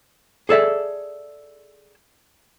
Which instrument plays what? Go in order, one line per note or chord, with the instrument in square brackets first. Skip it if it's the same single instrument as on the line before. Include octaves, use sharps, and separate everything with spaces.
[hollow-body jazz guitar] G#4 A4 D5 E5